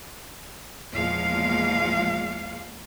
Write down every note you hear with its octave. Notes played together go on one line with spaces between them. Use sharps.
E2 A#2 F3 G#3 F5